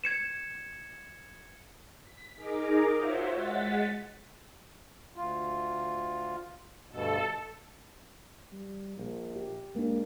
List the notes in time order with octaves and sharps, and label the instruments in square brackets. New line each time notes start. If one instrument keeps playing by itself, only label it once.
[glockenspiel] G#6 C#7 E7
[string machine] B6
D#4 G#4 A#4 A#5 D6
F4 F#4 C5 C#5 E5
G#3 F#5 A6 B6
[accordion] D2 F4
[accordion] D2 G2 B2 [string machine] A4
[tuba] G3
A#1
[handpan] G4
[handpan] G#3 D4 [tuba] A#3